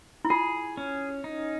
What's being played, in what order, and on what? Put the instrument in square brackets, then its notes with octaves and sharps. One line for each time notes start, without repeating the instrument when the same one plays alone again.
[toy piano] E4
[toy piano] F4 [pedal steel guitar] G#4
[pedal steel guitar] C#4
D#4